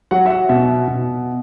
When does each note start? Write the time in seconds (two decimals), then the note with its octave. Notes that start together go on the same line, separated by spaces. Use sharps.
0.11 F#3 F#5
0.26 E5
0.30 F#5
0.49 B2 E5
0.88 B2